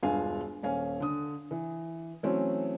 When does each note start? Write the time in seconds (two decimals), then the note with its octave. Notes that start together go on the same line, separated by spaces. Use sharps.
0.03 E1 G2 D4 F4 F5 G#5
0.63 D#1 C#4 F5 G#5
1.00 D3 D#6
1.51 E3
2.23 E3 F#3 A3 C4 C#4